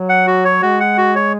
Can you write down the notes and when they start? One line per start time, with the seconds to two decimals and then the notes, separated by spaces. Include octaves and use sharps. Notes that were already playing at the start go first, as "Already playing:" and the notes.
Already playing: F#3
0.09 F#5
0.27 F#4
0.45 C#5
0.62 G#3 F#4
0.80 F#5
0.98 F#4
1.15 C#5